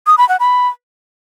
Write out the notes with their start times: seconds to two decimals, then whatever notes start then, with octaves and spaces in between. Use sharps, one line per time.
0.07 D#6
0.18 B5
0.29 F#5
0.40 B5